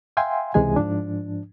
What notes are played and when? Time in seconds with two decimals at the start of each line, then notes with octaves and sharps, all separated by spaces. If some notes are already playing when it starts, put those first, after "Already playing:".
0.17 E5 F5 G5 G#5 C6
0.54 C#2 C3 E3 G#3 G#4 G#5
0.76 G#2 F3 D4